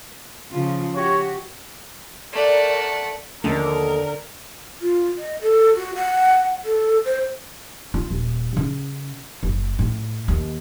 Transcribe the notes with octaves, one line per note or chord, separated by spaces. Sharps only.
C#3 F3 F4
F#4 G4 C#5
A3 A#4 D5 F#5
D#2 D3 D#3 F3 A3 C#4 A4 A#4
F4
D#5
A4
F#4
F#5
A4
C5
F4
D#1
C#3
F#1
A2
D#2